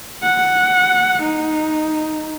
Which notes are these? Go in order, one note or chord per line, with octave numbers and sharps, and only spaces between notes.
F#5
D#4